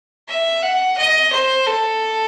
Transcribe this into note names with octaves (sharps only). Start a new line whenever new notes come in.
E5
F#5
D#5
C5
A4